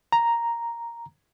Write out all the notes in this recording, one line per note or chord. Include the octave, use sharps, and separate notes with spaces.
A#5